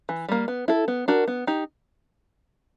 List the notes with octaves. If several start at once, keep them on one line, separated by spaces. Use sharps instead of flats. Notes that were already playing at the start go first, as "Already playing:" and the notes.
E3
G3 A#3
B3
E4 A4
B3
D4 F#4 A#4
B3
D#4 G4